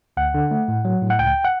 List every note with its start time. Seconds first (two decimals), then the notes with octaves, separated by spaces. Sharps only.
0.17 D2 F#5
0.34 D3
0.51 A3
0.68 A2
0.85 F#3
1.02 A2
1.10 F#5
1.19 C#2 G5
1.45 F#5